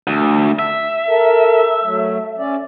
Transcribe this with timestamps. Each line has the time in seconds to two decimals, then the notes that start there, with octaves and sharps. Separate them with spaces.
0.07 D2
0.59 E5
1.08 A4 A#4
1.84 F#3 A3
2.38 C#4 D5